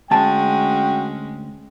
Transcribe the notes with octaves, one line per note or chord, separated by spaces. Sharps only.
D2 G#3 C#4 F#4 G5 A5